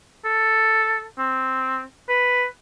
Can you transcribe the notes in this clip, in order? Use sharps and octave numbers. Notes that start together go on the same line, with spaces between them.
A4
C4
B4